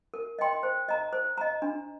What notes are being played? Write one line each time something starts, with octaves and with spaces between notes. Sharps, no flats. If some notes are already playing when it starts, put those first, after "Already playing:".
A#4
D#5 G5 C6
C5
D#5 A#5
C5
D#5 A#5
D4